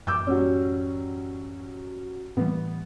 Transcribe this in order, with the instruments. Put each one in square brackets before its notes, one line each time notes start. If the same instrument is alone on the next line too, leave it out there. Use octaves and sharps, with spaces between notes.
[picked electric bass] A1 F#2 [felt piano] D6 E6 G6
[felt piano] F#3 G3 C#4
[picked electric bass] A2 E3 G3 [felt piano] B3